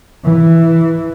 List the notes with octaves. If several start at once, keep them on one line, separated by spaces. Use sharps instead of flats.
E3